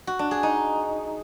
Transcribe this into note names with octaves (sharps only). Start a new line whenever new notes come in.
F#4
D4
G#4
D#4